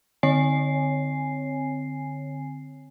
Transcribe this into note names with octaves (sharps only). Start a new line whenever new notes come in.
D3 C4 C#5 G#5 C7